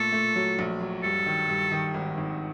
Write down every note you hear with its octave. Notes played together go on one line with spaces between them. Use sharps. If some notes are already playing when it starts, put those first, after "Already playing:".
Already playing: A#2 A3 A4
A3
F#3
A#1
F#3
G2 A4
D#3
G2
D#3
G#1
G#1